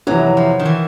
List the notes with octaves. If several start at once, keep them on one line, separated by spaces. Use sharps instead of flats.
F2 C3 E3 F#3
F3
D#3
E3